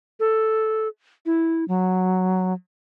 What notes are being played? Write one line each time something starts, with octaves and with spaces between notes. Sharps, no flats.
A4
E4
F#3